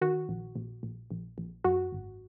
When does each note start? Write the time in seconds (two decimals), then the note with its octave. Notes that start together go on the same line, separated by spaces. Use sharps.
0.01 D#3 F#4
0.29 A#1
0.56 A#1
0.83 A#1
1.11 A#1
1.38 A#1
1.64 F#2 F#4
1.92 G#1